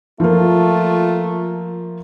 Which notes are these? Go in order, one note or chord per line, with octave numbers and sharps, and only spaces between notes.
F3 A3 A#3 F4